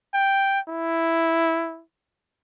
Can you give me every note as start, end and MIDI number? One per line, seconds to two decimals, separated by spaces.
0.14 0.60 79
0.68 1.82 64